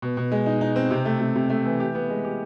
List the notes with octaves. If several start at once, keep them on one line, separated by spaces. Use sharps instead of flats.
B2
B2
G#3
D#4
D#4
C4
C3
A3
C3
C3
A3
E3
G4
B3
G#3
G4